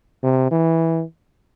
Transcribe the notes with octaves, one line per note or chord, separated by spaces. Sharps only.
C3
E3